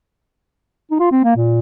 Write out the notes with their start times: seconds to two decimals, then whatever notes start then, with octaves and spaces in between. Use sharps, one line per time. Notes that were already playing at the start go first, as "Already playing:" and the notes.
0.91 D#4
1.00 F4
1.12 C4
1.24 A#3
1.36 A#2